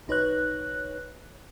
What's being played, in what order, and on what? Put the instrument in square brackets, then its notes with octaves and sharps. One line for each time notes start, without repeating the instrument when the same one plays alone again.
[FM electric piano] B1 D#4 B4 C#5 F#6